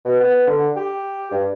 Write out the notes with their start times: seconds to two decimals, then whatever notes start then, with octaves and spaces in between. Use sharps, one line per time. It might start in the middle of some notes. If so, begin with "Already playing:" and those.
0.05 B2
0.20 B3
0.47 D3
0.76 G4
1.31 G2